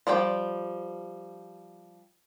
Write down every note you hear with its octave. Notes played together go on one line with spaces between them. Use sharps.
F3 G3 D5 G5